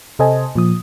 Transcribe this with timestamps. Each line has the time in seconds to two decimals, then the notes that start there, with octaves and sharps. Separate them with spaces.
0.19 C3 A4 C5 D#5 G#5 A5
0.55 A#2 F3 D#6